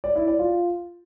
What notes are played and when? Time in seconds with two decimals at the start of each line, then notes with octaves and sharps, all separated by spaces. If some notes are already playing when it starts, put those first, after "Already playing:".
0.04 D5
0.16 E4
0.27 D5
0.39 F4